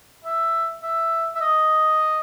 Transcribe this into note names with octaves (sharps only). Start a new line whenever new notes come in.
E5
E5
E5
D#5